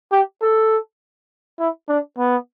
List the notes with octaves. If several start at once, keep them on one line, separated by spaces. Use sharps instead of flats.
G4
A4
E4
D4
B3